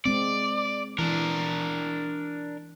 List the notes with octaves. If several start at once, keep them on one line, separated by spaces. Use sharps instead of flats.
G#3 C4 D5
E3 D4 A#4